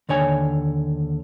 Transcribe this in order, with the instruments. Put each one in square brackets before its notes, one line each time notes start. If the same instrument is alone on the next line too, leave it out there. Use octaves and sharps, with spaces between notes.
[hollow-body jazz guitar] D#2 D3 C#5 G#5